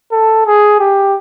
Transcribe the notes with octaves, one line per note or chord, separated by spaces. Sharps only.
A4
G#4
G4